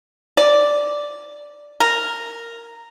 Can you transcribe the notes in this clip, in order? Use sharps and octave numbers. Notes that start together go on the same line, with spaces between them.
D5
A#4